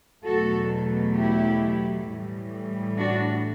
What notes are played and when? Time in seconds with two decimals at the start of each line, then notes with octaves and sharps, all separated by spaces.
0.24 E2 B2 F#3 A3 F#4 A4
1.15 E4 G4
2.07 A2 E3 G3
2.98 D4 F#4